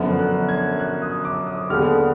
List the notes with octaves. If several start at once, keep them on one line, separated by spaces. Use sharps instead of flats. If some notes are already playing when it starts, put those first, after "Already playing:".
Already playing: F#2 D3 F3 B3
F#6
G#6
F#6
D#6
D6
D#6
D#2 D3 G#3 B3 F6